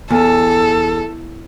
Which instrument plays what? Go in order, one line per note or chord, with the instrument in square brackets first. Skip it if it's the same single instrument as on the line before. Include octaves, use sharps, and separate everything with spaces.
[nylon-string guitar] E2 [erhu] A4